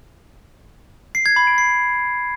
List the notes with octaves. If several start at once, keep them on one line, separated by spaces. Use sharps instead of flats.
C7
G#6
B5
D7
C7